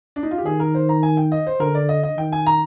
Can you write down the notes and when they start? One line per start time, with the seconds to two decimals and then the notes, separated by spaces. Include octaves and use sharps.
0.16 D4
0.23 D#4
0.31 F4
0.38 G4
0.45 D#3 G#4
0.60 A#4
0.75 C5
0.89 A#5
1.03 G#5
1.17 G5
1.32 D#5
1.47 C5
1.60 D3 A#4
1.75 D5
1.89 D#5
2.03 D#5
2.18 D#3 G5
2.32 G#5
2.46 A#5